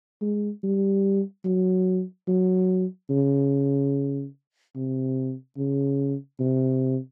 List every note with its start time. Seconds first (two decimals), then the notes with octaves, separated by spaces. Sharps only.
0.21 G#3
0.63 G3
1.45 F#3
2.28 F#3
3.10 C#3
4.76 C3
5.57 C#3
6.40 C3